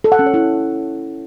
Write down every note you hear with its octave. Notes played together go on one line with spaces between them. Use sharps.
A4
F#5
C#4
C#5
E4